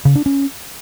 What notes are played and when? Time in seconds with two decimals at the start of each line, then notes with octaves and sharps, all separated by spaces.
0.05 C#3
0.15 D4
0.26 C#4